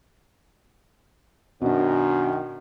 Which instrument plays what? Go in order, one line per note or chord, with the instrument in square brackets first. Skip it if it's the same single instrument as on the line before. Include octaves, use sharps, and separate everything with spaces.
[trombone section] F#2 D#3 [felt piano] B2 D4